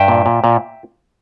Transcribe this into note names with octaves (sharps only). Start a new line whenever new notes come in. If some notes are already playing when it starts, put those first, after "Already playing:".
Already playing: G2 E5 G5
A#2
A#2
A#2